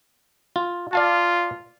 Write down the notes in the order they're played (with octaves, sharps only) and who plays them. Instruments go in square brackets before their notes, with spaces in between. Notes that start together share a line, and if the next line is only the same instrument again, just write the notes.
[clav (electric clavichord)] F4
[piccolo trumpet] F4 [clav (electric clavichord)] D5 F5 A5